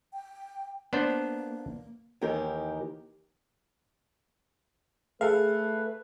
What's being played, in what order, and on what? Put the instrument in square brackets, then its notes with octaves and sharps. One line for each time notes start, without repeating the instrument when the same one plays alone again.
[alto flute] G5
[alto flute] A#3 [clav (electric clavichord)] B3 D4 C5
[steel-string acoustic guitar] D#2 D#3 E3 G4 A#4
[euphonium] A3 [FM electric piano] G#4 [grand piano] A4 F5 [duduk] B4